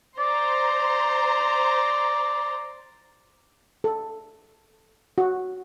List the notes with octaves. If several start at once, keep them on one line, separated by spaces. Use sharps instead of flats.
C5 D5 A#5 C6
A4
F#4